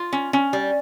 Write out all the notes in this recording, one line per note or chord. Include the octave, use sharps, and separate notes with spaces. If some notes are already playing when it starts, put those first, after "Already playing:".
Already playing: F4
C#4
C#4
G3